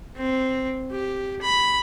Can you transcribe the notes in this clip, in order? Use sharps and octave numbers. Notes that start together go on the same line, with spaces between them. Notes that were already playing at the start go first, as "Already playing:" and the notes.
C4
G4
B5